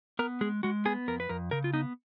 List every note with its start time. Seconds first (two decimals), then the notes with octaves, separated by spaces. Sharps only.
0.19 B3 A#4
0.41 G#3 G#4
0.63 G#3 F#4
0.85 B3 G#4
1.08 F2 A#4
1.20 B4
1.29 F2 A#4
1.51 C#3 A#4
1.64 F4
1.74 B3 D#4